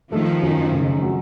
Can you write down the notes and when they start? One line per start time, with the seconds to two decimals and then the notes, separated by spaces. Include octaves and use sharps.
0.12 D#3 F3 A3
0.42 F#2
0.72 C#3
1.02 F#3